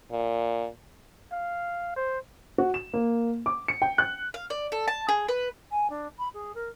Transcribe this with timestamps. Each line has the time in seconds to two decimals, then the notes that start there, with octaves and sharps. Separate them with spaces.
0.11 A#2
1.32 F5
1.96 C5
2.58 F#4
2.74 E7
2.94 A#3
3.46 D6
3.68 C#7
3.82 G5
3.98 F#6
4.34 F5
4.50 D5
4.72 A4
4.88 A5
5.09 G#4
5.28 B4
5.71 G#5
5.90 D4
6.19 B5
6.34 G#4
6.55 A#4